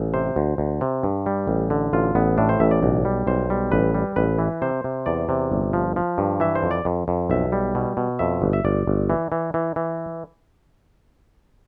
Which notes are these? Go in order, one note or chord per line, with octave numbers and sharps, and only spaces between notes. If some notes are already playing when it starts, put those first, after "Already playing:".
Already playing: A1
C3 C5
D2
D2
C3
G2
G3
A1
D3
A1 F4
A1 B3
A2 D4
C5
A1 E5
D5
B1
G3
B1 C5
G3
A1 B4
G3
A1 B4
E3
C3 C5
C3
E2 D5
C3
G1
F3
F3
G2
E3 E5
C5
F2
D5
F2
F2
B1 E5
G3
B2
B2
F2 E5
G1
E5
G1 D5
G1
E3
E3
E3
E3